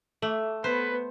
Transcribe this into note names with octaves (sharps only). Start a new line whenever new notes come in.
A3 A4
B3 B4 C5